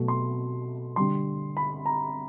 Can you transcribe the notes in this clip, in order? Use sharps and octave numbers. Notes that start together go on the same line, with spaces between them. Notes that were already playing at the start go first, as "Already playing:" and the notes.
Already playing: B2 F#3 A3
C6
D3 G3 C6
B5
A#5